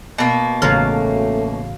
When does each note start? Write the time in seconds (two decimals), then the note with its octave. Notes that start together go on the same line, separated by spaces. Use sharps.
0.18 B2 A#3
0.62 A1 C#3 F#3 A3 C#4 F4 A#4 F5